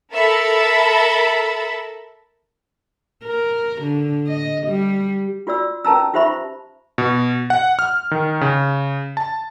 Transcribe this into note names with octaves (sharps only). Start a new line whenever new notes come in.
A4 A#4 E5 A5 B5
A#4
D3
D#5
G3
F4 F#4 D5 E6
C#4 B4 A5 A#5 E6
F4 G4 C5 E5 B5 C#6
B2
F#5
F6
D#3
C#3
A5